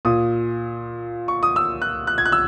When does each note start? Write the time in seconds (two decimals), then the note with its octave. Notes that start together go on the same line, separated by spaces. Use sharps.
0.05 A#2 D#6
1.28 C#6
1.43 D#6
1.56 E6
1.82 F#6
2.07 F#6
2.18 G#6
2.26 F#6
2.32 E6